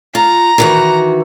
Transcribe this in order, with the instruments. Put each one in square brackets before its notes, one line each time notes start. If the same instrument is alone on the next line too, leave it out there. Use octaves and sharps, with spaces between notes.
[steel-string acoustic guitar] F4 [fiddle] A#5
[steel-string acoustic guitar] D#3 E3 F#4